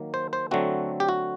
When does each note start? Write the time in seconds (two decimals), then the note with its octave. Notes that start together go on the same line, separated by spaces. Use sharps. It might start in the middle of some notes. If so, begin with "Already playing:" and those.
Already playing: D#3 F#3 A#3
0.14 C5
0.33 C5
0.51 D3 F#3 A3 C4 F#4
1.00 G4
1.09 F#4